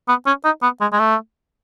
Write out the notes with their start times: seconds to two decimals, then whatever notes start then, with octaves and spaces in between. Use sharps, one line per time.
0.08 B3
0.26 C#4
0.45 D#4
0.62 B3
0.81 G#3
0.92 G#3
0.99 A3